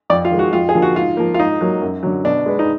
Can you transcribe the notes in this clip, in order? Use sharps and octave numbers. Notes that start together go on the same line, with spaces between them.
F2 D5
F4
D#3 G#3
F#4
F2 F4
G#4
D3 F3 A#3
F#4
G#2 F4
F3 A#3
F4
G#2 D#4
F#3 A#3
F#2
D3 F#3
B2 D4
G#3 B3
D#4